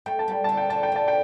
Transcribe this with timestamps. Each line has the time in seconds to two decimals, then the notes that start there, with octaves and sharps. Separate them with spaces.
0.06 A3 G5
0.19 A5
0.28 G3 G5
0.44 D3 A5
0.57 G5
0.70 D3 A5
0.83 G5
0.92 D3 A5
1.08 G5